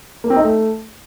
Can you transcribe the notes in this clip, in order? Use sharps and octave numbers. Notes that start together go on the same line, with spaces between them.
A#3
C4
D#4
A3